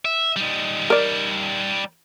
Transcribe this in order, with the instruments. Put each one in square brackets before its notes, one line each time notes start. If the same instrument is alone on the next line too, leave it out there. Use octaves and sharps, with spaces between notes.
[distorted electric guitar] E5
G3 D#4
[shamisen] A#4 D5